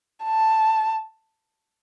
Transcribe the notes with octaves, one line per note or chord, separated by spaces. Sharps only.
A5